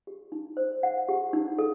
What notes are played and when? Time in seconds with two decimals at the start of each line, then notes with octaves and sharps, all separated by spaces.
0.07 G4
0.32 D#4
0.57 C5
0.83 F#5
1.09 G4
1.33 D#4
1.59 A4